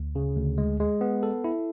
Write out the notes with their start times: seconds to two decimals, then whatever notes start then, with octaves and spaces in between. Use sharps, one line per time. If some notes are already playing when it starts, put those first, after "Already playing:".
Already playing: D2
0.15 C#3
0.37 D2
0.58 G#3
0.80 G#3
1.01 B3
1.23 A4
1.44 E4